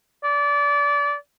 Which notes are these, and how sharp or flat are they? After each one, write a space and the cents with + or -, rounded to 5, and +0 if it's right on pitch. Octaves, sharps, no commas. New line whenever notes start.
D5 -25